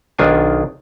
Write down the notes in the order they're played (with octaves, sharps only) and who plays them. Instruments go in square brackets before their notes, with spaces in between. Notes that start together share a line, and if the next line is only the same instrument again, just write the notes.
[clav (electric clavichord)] B1 D#3 D4 F4 G#5